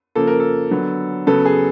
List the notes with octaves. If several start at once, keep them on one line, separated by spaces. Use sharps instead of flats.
C#3 F3 A#3 A4
A#4
A4
D3 F#3 B3
C#3 F#3 B3 A4
G#4